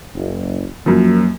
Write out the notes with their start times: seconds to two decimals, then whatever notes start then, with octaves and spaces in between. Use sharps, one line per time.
0.14 F#1
0.86 F#2 F3 F#3 A#3